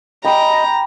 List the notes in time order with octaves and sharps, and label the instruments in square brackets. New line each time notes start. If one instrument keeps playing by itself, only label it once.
[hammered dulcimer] G4 D6 [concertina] D#5 [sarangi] A#5 [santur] B5